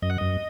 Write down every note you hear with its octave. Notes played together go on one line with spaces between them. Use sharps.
F#2 D#5
F#5
F#2 D#5